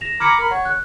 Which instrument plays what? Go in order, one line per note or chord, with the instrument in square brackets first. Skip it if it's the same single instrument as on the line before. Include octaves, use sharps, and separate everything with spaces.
[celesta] A#6 E7 F7
[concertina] A#5 B5 D6 [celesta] F6 G#6 C#7
[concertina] A#4 B5
[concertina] C#5 [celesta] F#5
[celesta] F#6